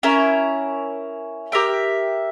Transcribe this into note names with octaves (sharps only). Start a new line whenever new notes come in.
C#4 E4 A#4
G4 A#4 E5 G5